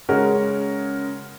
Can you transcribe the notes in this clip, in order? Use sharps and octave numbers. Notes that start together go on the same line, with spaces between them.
C#3 G#3 C#4 F#4 A#4